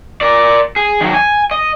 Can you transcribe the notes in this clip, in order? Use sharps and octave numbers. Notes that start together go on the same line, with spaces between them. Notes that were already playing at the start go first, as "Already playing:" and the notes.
A#4 D5
G#4
D#3 F#3
G#5
D#5